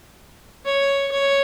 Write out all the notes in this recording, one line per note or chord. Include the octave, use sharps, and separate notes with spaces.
C#5
C#5